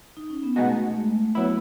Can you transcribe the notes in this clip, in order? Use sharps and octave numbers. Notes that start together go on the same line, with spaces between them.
D#4
C#4
B3
B2 G#3 A3 B3 D#4 F#4
A3
A3
G#3
A3
F#3 B3 E4